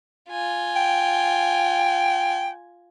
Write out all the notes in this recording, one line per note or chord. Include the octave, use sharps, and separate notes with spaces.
F4 G#5
G5